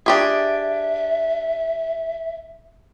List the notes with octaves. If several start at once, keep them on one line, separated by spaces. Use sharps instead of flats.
D4 G4 G#4 E5